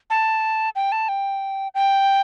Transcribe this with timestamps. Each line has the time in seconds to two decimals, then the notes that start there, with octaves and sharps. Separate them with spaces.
0.10 A5
0.76 G5
0.92 A5
1.09 G5
1.75 G5